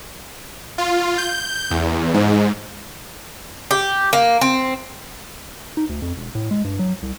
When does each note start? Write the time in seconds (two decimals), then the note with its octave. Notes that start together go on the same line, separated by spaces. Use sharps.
0.78 F4
1.18 G6
1.71 E2
2.14 G#2
3.71 G4
4.13 A#3
4.41 C4
5.77 D#4
5.89 D2
6.02 F2
6.16 E1
6.35 A2
6.51 G#3
6.64 G2
6.79 F#3
7.02 C2